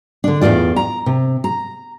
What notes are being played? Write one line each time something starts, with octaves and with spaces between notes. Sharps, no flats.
D3 D4
E2 A2 C#3 F4 D5
A#5
C3
A#5